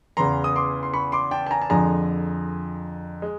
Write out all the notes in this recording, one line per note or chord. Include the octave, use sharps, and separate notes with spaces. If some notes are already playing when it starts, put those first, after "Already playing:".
E2 C#3 E3 A#5 C6
D#6
C6 D6
C6
B5 C#6
C6 D6
G5 A5
A5
G#5 A#5
A5
F2 D3 F3 G#3 G#5 A#5
G#3